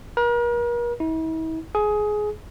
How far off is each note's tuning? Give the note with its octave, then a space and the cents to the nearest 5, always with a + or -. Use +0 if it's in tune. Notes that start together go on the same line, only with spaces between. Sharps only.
A#4 +40
E4 -45
G#4 +15